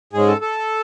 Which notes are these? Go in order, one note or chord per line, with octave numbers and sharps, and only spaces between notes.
G#2 G#3 C#4 G#4
A4
A4